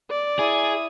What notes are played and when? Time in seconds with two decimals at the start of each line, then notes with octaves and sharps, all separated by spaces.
0.10 D5
0.39 E4 G#4 D#6